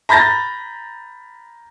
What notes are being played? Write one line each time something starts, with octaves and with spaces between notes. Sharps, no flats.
A#5 B5 G6 A6 A#6